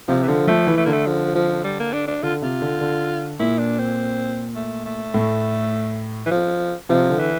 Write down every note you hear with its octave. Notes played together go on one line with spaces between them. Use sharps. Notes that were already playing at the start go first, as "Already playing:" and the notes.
C3 F3
E3
D3 F3
F3 A3
E3
A3
D3 A#3
A3
F3
F3
G3
A#3
D4
D4
D3 F4
C3 F4
D3
D3
A#2 E4
D4
C4
A3
A3
A2
E3
F3
C3 F3
D3
E3